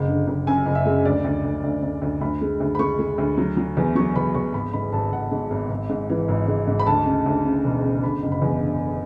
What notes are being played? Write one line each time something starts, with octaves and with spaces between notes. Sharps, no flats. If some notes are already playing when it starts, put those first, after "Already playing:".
Already playing: F#1 G#3
D3
F#1
F#2 G#5
F#1
E5
G#3
D2 D5
D2
D2
D2
D2
D2
D2 B5
G#3
D2
B5
G#3 C#6
G#3
D2
F#3
F#3
E2
F#3 C#6
E2 B5
E2 C#6
G#1 B5
G#2 B5
G#1 A5
G#1 F#5
G#2
G#1
G#1
G#2
E3
G#1
G#2
G#2
B5
D2 A5
C#3
D2
C#3
E1
C#3
D3 B5
F#1
B5
E2
D3
D3